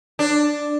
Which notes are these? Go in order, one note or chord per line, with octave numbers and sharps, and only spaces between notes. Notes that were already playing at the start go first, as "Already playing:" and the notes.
D4